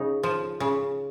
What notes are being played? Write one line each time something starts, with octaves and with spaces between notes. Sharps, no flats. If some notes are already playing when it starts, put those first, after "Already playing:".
Already playing: C#3 D#4
F3
C#3